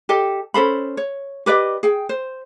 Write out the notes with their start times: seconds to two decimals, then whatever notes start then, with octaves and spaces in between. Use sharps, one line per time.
0.09 G4 A4 D#5
0.54 C#4 A4 C5 B5
0.97 C#5
1.46 G4 B4 D5 D#5
1.83 G#4 G5
2.09 C5